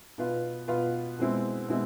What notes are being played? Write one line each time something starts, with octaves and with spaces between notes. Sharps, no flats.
B2 B3 F4 B4
B2 B3 F4 B4
B2 G#3 C4 E4
B2 G#3 C4 E4